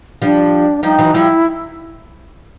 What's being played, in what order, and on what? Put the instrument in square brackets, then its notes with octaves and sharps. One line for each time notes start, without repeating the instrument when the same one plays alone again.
[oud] F3 G3 [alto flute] D4
[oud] F3 G3 [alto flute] D#4
[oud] E3 F#3
[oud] F3 G3 [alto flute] E4